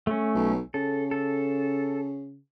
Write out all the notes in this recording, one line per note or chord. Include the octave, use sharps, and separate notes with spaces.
A3 C#4
B1
C#3 A4
A4